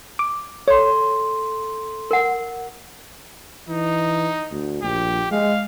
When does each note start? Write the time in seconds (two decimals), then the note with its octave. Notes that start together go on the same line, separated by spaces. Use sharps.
0.19 D6
0.68 A4 C#5 C6
2.11 A#4 F#5
3.68 E3 D#4
4.51 D2
4.83 A#1 G4
5.32 G#3 F5